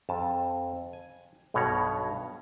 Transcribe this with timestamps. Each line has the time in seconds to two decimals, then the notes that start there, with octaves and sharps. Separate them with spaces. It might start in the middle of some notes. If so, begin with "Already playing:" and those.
0.09 F2 A5
0.93 G#5
1.54 B1 G2 B2 C#5 F#5 A#5